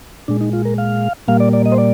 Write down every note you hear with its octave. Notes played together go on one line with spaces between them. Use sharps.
A#2 G#3 D4
D#4
F4
A#4
F5
A#2 G3 A#3 F5
D5
D5
D#5
C5
D5